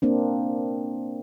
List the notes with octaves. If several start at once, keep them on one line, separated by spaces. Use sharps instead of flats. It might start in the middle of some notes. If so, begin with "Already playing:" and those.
A#3 C4 D4